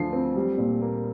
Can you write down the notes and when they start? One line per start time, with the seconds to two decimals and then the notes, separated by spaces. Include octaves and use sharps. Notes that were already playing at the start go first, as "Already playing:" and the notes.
Already playing: D2 D3 F3 C7
0.13 C4
0.36 G3
0.58 A#2
0.82 A#3